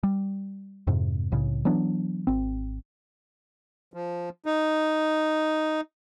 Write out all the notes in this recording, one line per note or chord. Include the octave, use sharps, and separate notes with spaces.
G3
F2 G#2 C3
C2 A2 C#3
E3 F#3 B3 D4
G#1 C4
F3
D#4